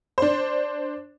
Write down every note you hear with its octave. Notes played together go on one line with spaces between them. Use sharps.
D4 C5